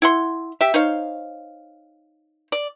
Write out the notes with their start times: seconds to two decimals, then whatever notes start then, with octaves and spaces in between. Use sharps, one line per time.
0.02 E4 F#5 C6
0.61 G4 E5
0.74 D#4 C5 C#5 F5
2.52 D5